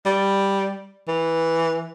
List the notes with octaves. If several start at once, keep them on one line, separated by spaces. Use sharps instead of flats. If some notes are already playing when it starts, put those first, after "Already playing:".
G3
E3